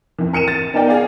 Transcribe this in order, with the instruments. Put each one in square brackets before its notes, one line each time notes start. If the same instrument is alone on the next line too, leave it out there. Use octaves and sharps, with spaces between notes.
[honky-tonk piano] F2 E3
A#4 C#7 D#7 E7
A6
B3 D#4 A#4 D5 G5
G#4 D5 F5